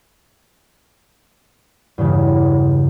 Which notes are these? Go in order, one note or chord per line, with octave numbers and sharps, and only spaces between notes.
E2 G2 C#3